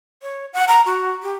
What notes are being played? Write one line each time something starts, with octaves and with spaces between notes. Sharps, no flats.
C#5
F#5
A#5
F#4
G4